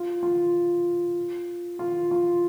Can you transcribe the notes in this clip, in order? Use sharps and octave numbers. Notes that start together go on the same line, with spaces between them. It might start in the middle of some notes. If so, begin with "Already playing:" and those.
Already playing: F4
F4
F4
F4